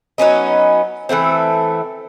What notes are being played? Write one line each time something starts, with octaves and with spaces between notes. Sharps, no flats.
F#3 B3 C#4 D#4
E3 F#3 A3 C4